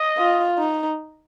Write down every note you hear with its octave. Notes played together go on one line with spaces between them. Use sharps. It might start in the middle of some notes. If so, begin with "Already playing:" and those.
Already playing: D#5
F4
D#4